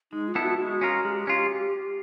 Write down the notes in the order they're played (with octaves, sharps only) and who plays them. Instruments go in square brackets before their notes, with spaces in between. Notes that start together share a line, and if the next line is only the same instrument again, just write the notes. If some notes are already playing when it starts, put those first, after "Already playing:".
[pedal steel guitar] G#3 [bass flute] D#4
[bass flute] F4
[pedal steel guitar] B3 E4 A4
[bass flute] F#4
[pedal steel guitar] G#3 [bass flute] F#4
[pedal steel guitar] C#4 F4 A#4
[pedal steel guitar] G#3 [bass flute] G4
[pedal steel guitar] C#4 F4